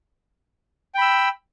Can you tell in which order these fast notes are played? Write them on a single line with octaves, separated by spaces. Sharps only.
G5 B5 E6